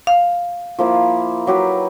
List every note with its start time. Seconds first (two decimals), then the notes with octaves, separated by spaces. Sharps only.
0.07 F5
0.78 F3 A#3 E4
1.47 F#3 G4 B4